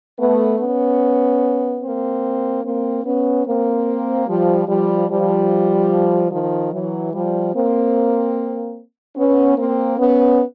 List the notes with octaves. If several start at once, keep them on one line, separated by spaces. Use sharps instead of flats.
A3 B3
B3 C#4
A#3 C4
A#3 C4
B3 C#4
A#3 C4
F3 G3
F3 G3
F3 G3
D#3 F3
E3 F#3
F3 G3
A#3 C4
B3 C#4
A#3 C4
B3 C#4